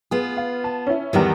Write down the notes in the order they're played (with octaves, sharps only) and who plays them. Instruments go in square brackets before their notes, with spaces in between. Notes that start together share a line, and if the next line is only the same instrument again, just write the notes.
[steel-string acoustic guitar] B3 F4 [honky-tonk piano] G#4
[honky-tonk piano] F5
A5
C#4 E4
[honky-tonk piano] E2 E3 [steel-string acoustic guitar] D#3 G3 B3